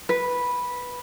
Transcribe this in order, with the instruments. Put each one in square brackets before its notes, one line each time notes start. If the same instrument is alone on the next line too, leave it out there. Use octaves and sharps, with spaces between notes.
[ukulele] B4